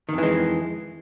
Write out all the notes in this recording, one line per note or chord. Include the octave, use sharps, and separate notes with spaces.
F2 D#3 E3 G#3